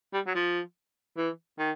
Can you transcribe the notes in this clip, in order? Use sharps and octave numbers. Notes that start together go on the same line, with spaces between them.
G3
F#3
F3
E3
D#3